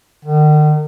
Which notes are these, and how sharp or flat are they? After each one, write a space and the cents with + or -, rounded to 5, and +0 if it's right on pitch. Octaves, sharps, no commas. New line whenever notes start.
D#3 -40